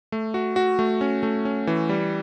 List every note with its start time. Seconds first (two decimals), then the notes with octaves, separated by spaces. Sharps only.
0.12 A3
0.34 F#4
0.56 F#4
0.79 A3
1.01 C#4
1.23 A3
1.45 C#4
1.67 E3
1.89 G3